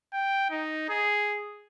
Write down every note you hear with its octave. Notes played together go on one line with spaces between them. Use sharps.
G5
D#4
G#4